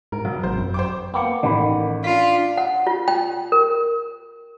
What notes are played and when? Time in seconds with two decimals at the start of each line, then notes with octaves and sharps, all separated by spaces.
0.12 G#2 A#4
0.25 E1 F#3
0.43 G#1 C5
0.58 F#2
0.74 C5 G5 D6
1.14 A#3 B3 G5 D6 C#7
1.43 A1 D#3 B5
2.04 D4 F4 B6
2.57 F#5
2.87 F4
3.08 G5
3.52 A#4